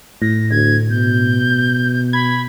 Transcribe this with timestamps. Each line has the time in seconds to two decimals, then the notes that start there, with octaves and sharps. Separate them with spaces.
0.22 A2 A#6
0.50 D2 G#6
0.90 B2 G6
2.13 B5 G#6